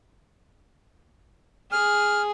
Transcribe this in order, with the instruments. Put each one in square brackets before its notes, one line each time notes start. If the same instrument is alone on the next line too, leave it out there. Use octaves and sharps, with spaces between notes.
[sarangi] G#4 [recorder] F6